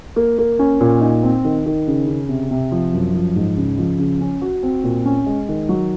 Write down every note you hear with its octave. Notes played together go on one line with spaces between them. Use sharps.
A#3
A#3
C#4
A#2
D#4
C4
D#3
D#3
C#3
C#3
C3
C3
F3
F#2
F3
G#2
C#3
F3
C#3
C#4
F#4
C4
A#2
C#4
G#3
D#3
F#3